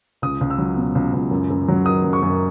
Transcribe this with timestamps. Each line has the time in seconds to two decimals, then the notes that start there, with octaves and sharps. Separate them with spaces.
0.22 C#2 D#6
0.41 C#2
0.50 E6
0.58 F#3
0.77 B2
0.95 C#2
1.13 C#2
1.31 F#2
1.50 F#2
1.68 F#3
1.86 D#3 D#6
2.04 F#2
2.13 C#6
2.22 F#2